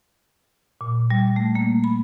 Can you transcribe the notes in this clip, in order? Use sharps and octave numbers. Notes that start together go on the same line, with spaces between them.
A#2
G3
A3
A#3
B5